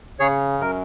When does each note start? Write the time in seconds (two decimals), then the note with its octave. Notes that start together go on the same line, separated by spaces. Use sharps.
0.20 C#3 G#4 C#5
0.59 F#2 A#4